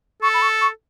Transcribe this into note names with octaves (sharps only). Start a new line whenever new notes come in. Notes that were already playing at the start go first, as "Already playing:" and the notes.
A4 C#6
B5
C#6
C#6